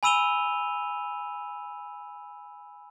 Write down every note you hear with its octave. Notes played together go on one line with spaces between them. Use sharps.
G#5 B5 E6 D#7 F7 G7